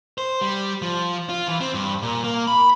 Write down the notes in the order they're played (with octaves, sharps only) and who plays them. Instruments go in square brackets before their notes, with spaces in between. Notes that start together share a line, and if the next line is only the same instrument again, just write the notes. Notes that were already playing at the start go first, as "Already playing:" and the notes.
[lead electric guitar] C5
G3
F3
F4
E3
C4
G2
A#2
A#3
B5